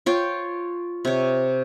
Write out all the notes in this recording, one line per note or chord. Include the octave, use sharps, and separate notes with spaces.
F4 C#5 G5
C3 C#5